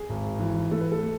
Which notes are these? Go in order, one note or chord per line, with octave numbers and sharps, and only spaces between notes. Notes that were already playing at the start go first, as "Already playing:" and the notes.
Already playing: G#4
G#1
E3
A3 A4
B4
A4
A3